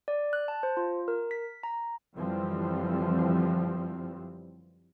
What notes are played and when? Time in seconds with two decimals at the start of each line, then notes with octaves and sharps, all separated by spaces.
0.08 D5
0.33 F#6
0.48 A5
0.63 C5
0.77 F4
1.08 A#4
1.31 B6
1.63 A#5
2.16 F#2 D3 E3 F3 G3 C4